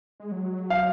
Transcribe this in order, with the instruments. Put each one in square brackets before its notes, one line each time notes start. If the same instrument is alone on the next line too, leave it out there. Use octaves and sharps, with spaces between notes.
[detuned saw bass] G#3
F#3
[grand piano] F5